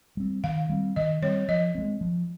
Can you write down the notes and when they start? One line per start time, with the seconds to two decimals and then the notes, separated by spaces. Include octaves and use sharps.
0.17 G3 C4
0.44 D#3 F5
0.69 G3 C4
0.96 D#3 D#5
1.22 G3 C4 C#5
1.49 F3 D#5
1.75 G#3 C4
2.01 F3